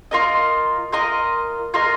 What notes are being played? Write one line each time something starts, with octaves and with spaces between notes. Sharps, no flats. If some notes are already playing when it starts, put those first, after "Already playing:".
F4 A#4 D#5
F4 A#4 D#5
F4 A#4 D#5